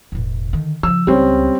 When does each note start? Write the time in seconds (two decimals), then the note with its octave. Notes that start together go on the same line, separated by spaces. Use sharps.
0.12 E1 A2
0.53 D3 D#3
0.83 C#3 F3 E6
1.07 C#2 G3 C4 C#4